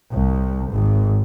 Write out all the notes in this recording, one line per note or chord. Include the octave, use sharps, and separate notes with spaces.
C2
G#1